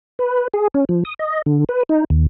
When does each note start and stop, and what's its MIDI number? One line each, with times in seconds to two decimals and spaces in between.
0.19 0.48 71
0.54 0.68 68
0.74 0.85 61
0.89 1.03 53
1.05 1.14 87
1.19 1.42 75
1.46 1.64 50
1.69 1.83 71
1.89 2.04 63
2.10 2.26 39